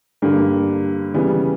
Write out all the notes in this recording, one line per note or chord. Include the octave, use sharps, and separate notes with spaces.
G2 D3 A#3
C#3 E3 G3 B3